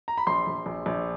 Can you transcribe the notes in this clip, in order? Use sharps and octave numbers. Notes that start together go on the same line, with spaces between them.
A#5
B5
A#1 C6
A#1
A#1
A#1